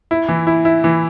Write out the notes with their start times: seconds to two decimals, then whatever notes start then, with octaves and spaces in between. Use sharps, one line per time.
0.11 E4
0.28 E3
0.47 E4
0.65 E4
0.84 E3